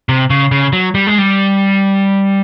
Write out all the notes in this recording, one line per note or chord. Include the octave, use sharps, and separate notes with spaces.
C3
C#3
C#3
F#3
G3
G#3
G3